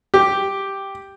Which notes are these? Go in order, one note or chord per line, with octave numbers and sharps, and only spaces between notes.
G4